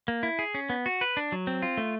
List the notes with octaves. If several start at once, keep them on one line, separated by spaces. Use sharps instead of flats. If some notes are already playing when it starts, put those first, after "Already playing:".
A#3
E4
G#4
C#4
B3
F#4
B4
D4
F#3
C4
F4
A3